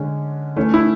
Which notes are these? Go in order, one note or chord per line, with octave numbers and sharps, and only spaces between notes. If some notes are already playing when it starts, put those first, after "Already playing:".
Already playing: D3 G#3 C#4
E3 A3 C#4
E4